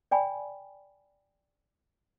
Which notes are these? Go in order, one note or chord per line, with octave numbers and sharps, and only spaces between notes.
D5 G5 G#5 B5